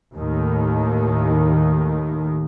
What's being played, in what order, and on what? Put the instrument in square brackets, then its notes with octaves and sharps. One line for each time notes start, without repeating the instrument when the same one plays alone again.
[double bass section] D#2 A2 D#3